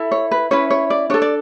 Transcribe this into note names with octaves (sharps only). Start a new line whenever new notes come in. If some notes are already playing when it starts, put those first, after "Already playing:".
Already playing: E4 A4
C#5
B4
C#4 E4 B4 C#5
C#5
D5
D4 A4 C#5
D5